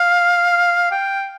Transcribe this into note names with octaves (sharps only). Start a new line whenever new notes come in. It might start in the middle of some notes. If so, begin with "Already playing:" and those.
Already playing: F5
G5